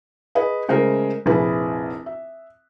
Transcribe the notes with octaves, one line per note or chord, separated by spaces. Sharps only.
G#4 B4 D#5
C#3 G#3 A3 A#4 C5
F1 A#1 E4 G#4 B4
E5